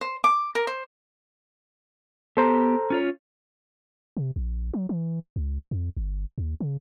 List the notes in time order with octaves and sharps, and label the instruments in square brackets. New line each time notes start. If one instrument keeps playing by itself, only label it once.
[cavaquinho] C5
D6
A#4
C5
[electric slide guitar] B3 G4 [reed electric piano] A4 C5 A#5
[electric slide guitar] C#4 F4 C#5
[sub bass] C3
A#1
F#3
E3
C#2
F2
G1
D#2
C#3